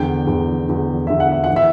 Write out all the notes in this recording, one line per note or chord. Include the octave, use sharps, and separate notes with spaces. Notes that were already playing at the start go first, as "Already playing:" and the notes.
Already playing: E2 D3 G5
E2 D3
E2 D3
E2 D3 E5
F#5
E5
F#5
E3 E5